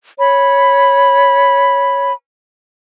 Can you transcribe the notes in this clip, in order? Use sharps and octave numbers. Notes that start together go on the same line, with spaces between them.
C#5 B5